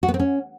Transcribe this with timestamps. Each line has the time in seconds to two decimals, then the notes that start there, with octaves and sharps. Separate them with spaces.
0.03 F#4
0.08 B3
0.14 C4
0.19 C#4